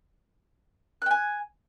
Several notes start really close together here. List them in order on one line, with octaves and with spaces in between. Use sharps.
F#6 G5 G#5